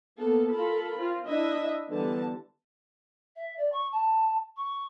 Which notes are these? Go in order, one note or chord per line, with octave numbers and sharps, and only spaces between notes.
A#3 B3 A4
F4 A4 A#4 B5
C4 F4
D4 E4 D#5 E5
D3 E3 G3 B3 A5
E5
D5
C#6
A5
C#6